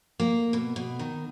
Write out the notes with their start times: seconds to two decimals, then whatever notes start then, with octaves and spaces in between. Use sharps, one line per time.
0.20 A#3
0.53 B2
0.76 B2
0.99 D#3